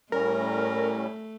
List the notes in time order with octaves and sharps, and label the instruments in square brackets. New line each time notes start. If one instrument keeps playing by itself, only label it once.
[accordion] A2 G3 C#4 [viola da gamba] A3 [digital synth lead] A#4